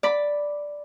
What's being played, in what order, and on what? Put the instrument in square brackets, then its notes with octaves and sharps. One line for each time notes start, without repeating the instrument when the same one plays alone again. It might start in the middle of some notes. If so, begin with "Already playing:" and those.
[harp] D5 B5